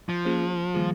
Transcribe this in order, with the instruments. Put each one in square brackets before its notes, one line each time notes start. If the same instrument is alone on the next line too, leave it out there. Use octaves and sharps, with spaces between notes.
[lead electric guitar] F3
[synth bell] A#3 C#4 F4 G#4 C5
D#3 G3 A#3 F4 G#4